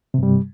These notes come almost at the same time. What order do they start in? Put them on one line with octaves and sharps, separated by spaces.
C3 G2 G3